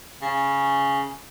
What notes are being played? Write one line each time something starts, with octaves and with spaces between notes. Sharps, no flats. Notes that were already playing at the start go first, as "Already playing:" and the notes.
C#3